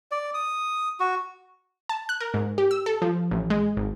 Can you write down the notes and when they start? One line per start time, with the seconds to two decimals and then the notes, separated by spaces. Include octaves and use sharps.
0.11 D5
0.34 D#6
1.00 F#4
1.89 A5
2.09 F#6
2.20 A#4
2.34 G#2
2.58 G4
2.71 E6
2.86 A4
3.02 F3
3.31 A1
3.50 G#3
3.77 G#1